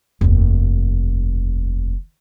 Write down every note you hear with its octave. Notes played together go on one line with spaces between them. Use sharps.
F1 D#2